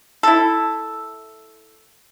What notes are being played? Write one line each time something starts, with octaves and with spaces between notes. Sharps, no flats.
E4 A4